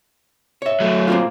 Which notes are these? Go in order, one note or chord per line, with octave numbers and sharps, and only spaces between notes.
C#5 E5
F#3 A3
A#3 C4 F4